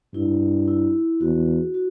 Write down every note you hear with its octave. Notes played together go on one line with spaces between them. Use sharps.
G2 E4
E4
E2 F#4
F#4